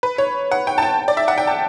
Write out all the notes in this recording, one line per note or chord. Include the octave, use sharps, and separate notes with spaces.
B4
C#5
F#5
G5
A5
G5
D5
E5
F#5
G5
A5